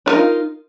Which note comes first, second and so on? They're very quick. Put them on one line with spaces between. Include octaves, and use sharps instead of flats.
D4 A#4 D#4 F4